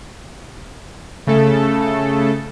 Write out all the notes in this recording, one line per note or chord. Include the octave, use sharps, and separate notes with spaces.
C#3 A3 A4